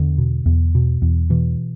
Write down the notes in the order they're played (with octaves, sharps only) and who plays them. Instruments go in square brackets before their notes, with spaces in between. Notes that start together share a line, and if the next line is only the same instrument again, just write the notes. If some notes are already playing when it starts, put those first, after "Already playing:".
Already playing: [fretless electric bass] E2 D3
B2
E2
B2
E2
B2 E3